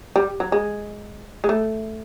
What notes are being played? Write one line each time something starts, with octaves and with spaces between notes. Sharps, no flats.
G3
F#3
G#3
G#3
A3